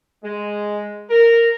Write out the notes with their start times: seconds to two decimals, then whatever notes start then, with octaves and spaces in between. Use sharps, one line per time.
0.25 G#3
1.10 A#4